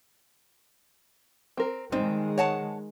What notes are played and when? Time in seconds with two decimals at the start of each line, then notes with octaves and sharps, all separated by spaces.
1.57 C4 A#4
1.92 D#3 G3 G#3 C4 D#4
2.38 C#5 F#5 A5